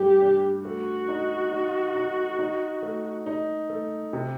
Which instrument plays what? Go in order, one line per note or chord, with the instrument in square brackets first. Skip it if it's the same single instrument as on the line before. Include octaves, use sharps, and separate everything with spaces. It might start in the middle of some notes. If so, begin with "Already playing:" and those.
Already playing: [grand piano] G2 A3 [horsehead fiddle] G4
[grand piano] D4
[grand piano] A3 [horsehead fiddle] F#4
[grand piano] D#4
D#4
D#4
D#4
A3
D#4
A3
C3